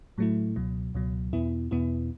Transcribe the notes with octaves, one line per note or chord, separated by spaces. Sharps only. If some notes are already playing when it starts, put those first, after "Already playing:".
A2 F#3 A3 E4
C#2 B2 F#3
C#2 B2 F#3
E2 B2 B3 E4
E2 B2 B3 E4